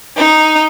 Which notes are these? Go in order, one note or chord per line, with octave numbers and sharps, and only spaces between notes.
D#4